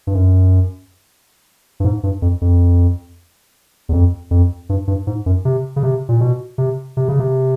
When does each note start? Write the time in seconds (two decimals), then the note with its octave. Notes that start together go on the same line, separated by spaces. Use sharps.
0.07 G2
0.14 F#2
1.80 G2
1.85 G#2
2.03 G2
2.22 F2
2.41 F2
3.89 E2
3.93 F2
4.31 F2
4.69 G2
4.87 G2
5.07 G#2
5.26 F#2
5.45 C3
5.76 C#3
5.83 C3
6.09 A#2
6.21 B2
6.58 C3
6.97 C3
7.08 C#3
7.19 C3